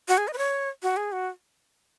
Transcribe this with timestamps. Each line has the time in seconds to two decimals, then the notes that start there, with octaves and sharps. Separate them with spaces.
0.08 F#4
0.18 G#4
0.28 D#5
0.33 B4
0.38 C#5
0.83 F#4
0.97 G#4
1.12 F#4